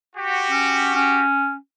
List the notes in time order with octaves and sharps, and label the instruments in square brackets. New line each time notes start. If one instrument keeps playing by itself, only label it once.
[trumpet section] F#4 G4
[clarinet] C#4
C#4